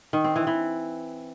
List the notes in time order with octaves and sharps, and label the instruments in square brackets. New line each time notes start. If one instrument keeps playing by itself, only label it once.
[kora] D#3
C4
E3
E3